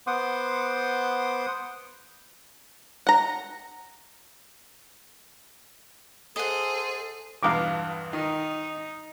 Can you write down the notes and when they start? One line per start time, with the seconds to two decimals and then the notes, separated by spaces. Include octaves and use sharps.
0.07 B3 C5 F#5 C6 D6 D#6
3.07 F#5 A#5
6.36 G#4 A4 C5 D#5 F#5
7.43 B1 E2 G2 F5 A#5 D6
8.13 D#3 D#4